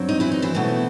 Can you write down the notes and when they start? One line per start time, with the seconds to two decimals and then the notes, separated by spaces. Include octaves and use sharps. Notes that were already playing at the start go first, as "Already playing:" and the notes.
Already playing: G2 F#3 C4
0.09 D#4
0.20 E3 E4
0.32 D#4
0.42 E3 E4
0.55 B2 A3 C4